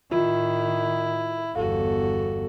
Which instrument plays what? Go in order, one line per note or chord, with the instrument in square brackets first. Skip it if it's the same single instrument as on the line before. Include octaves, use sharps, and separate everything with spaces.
[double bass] A2 D#3 [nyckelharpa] E4 [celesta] F4
[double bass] G1 E2 [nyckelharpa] F#4 A4 [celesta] F5